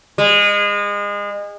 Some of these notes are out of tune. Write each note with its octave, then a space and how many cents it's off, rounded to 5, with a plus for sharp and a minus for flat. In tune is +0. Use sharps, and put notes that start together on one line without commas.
G#3 -30